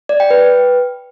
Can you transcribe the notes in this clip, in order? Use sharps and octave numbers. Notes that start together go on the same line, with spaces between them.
D5
G5
B4